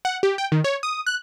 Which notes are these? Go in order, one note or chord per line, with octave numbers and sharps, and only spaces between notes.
F#5
G4
G5
D#3
C#5
D#6
F#6